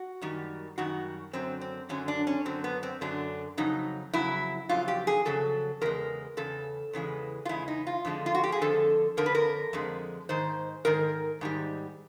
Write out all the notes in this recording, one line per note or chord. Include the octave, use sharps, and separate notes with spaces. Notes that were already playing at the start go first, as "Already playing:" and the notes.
Already playing: F#4
F#2 D#3 G3
F#2 D#3 G3 F#4
F#2 D3 F#3 C4
C4
F#2 D3 F#3 C#4
D4
C#4
F#2 D3 F#3 C4
B3
C4
F#2 D3 F#3 D4
F2 C#3 F#3 D#4
F2 C#3 F#3 E4
F2 C#3 F#3 F4
G4
G#4
F2 C#3 F#3 A4
E2 C#3 G#3 A#4
E2 C#3 A4
E2 C#3 E3 G#3
F4
E2 C#3 G#3 E4
D#4
F4
F2 D3 F3 G#3
F4
F#4
G4
G#4
F2 D3 F3 A4
F2 D3 F3 A#4
B4
A#4
F2 D3 F3 G#3
G#2 D#3 C5
G#2 D#3 A#4
G#2 D#3 G3